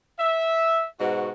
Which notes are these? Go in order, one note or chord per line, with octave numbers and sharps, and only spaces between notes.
E5
G#2 B2 F#4